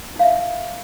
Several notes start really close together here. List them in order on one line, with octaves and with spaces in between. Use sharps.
D#4 F5 E5